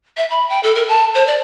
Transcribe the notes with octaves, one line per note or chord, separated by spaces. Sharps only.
E5
B5
G5
A4
A#4
A5
C5
D5